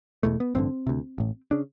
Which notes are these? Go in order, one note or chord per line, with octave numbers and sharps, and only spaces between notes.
E1 E2 B2 A3
B3
A1 G2 D3 C4
D2 C3
A1 A2
C#3 D4